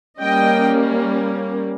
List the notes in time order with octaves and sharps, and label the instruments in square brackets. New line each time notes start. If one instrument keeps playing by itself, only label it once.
[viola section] G3 A#3 C#4 D#5 G5